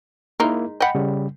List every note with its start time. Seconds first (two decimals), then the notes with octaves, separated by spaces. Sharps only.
0.40 G#3 A#3 D#4 E4 A#4
0.80 D#5 F#5 G5 B5
0.95 C#3 G3